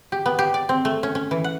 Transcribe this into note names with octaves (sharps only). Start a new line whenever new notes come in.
G4
B3
G4
D5
C4
A3
C#4
C#4
E3
F#5